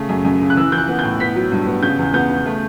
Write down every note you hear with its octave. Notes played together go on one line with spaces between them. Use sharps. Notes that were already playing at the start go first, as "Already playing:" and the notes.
Already playing: C#3 A3
F#2
F#2
C#3
F#6
E3 E6
E3 G6
F#6
B3
A2 G6
B3 B6
F#3
G2
B3
C#3 G6
E2
B3 G6
C#3
A3